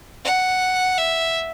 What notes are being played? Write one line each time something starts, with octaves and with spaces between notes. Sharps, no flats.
F#5
E5